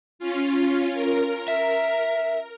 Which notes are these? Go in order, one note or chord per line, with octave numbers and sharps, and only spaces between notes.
C#4 F4
A#4
E5